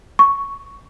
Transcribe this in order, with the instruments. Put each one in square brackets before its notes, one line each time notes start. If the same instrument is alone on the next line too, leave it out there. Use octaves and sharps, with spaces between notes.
[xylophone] C#6